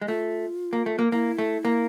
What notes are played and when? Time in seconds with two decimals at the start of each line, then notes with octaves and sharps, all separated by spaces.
0.01 G#3
0.08 A3 F4
0.73 A#3
0.86 A3
0.99 A#3
1.12 A#3 E4
1.38 A3
1.65 A#3